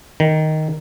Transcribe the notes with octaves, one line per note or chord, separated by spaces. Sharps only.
D#3